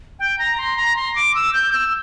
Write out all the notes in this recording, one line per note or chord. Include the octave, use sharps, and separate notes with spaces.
G5
A#5
C6
A#5
C6
D6
E6
G6
E6